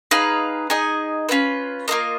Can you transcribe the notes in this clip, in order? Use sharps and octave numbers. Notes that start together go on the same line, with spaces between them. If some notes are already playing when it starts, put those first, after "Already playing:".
D#4 G#4 B4 F5
D#4 G#4 D#5 G#5
C#4 F4 B4
A#3 F4 A#4 D#5